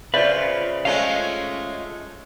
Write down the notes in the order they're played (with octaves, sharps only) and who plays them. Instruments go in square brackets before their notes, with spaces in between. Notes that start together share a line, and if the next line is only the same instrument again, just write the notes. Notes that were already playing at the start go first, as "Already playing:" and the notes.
[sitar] C#3 [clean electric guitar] F4 B4 [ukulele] C5 D5 E5
[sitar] G#3 A3 C#4 [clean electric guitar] F4 D#5 F5